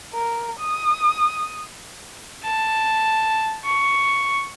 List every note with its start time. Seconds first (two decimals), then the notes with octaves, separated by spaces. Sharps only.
0.14 A#4
0.60 D#6
2.44 A5
3.65 C#6